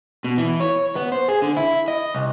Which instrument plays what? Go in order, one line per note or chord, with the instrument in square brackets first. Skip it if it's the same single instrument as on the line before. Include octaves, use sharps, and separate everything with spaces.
[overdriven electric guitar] B2
E3
C#5
B3
C5
G#4
D3
E4
D#5
C2